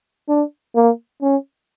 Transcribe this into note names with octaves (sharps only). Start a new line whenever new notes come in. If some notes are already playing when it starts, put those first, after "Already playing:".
D4
A#3
C#4